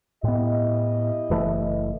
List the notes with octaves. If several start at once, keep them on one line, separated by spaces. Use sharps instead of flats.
A2 B3 E4 G4 D#5
F#1 E3 A3